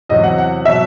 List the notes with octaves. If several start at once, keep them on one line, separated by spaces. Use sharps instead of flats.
E2 C3 F#3 D#5
F#5
F#5
B2 F#3 E5